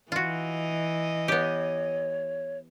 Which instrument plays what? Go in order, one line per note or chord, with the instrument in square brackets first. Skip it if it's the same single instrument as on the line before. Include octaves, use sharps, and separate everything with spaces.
[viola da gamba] E3 D#5 [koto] F4 F#4
[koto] B3 G4 [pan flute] C#5